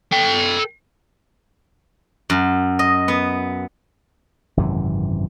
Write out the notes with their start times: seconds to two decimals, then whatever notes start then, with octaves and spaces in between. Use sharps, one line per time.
0.12 A4 G5
2.30 F#2
2.79 D#5
3.08 B3
4.57 G#1 F#2 C3 E3